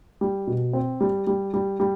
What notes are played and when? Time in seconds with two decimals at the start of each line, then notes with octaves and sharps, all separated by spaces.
0.21 G3
0.47 B2
0.73 C4
1.00 G3
1.27 G3
1.54 G3
1.80 G3